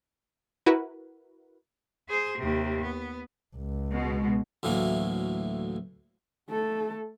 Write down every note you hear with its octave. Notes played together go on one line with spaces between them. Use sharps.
E4 F#4 A#4 B4
G#4 C5
D#2 C3
B3
C#2
B2 G#3
D2 A2 E3 F#3 A#3
A3 A4